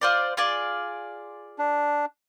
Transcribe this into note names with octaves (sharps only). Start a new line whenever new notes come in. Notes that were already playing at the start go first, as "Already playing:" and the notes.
F4 C5 D5
F4 G#4 D5
D4